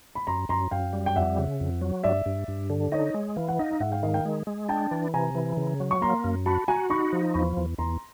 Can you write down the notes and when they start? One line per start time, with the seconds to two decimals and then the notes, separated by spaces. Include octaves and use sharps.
0.15 B5
0.27 F#2 A#5 C6
0.49 F#2 A#5 C6
0.71 F#2 F5 G5
0.93 G3
1.06 G5
1.16 F2 E5 F#5
1.38 C#3
1.60 F2
1.81 F#3
2.03 G2 D5 E5
2.26 G2
2.48 G2
2.70 D3
2.92 D#4 C#5 D#5
3.14 G#3
3.36 E3 F5
3.48 F#5
3.59 D#4 D#5 F5
3.71 F5
3.80 G#2 E5 F#5
3.92 F5 G5
4.03 D#3 D#5 F5
4.14 F5 G5
4.25 G#3
4.47 G#3
4.69 D4 G5 A5
4.91 E3
5.14 C3 G#5 A#5
5.35 E3
5.57 C#3
5.80 F#3
5.91 C#6
6.01 A#3 A#5 C6
6.24 F#2
6.46 F#4 A5 B5
6.68 F#4 G#5 A#5
6.90 D#4 B5 C#6
7.13 F3
7.34 E2 B5 C#6
7.57 E2
7.78 E2 A#5 C6